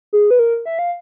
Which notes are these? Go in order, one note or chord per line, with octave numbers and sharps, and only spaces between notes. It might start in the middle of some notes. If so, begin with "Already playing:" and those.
G#4
B4
A#4
E5
F5